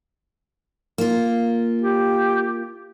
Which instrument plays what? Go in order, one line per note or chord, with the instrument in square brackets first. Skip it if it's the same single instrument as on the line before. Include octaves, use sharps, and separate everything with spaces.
[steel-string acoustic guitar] A#3 F4
[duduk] G4